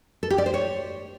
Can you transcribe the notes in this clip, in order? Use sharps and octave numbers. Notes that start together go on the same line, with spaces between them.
A4
G4
D5
C5
C#5